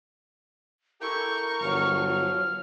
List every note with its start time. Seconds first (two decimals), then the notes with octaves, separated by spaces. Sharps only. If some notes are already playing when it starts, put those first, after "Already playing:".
1.01 E4 G4 A4 A#4 C#6 G6
1.61 G1 F3 F#3 F6